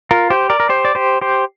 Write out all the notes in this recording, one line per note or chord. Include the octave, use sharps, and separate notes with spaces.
F4 A#4
G4 C5
A#4 D5
A#4
G4 C5
D5
G4 C5
G4 C5